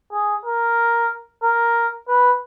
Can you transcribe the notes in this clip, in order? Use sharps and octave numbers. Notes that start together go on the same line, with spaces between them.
G#4
A#4
A#4
B4